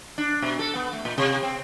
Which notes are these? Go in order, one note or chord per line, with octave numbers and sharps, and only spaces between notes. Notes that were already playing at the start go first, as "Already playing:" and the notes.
D4
B2
A4
B3
A3
A#2
C3
C4